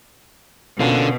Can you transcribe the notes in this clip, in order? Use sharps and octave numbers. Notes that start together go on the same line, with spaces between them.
B2 D3 A#3 C#4 F4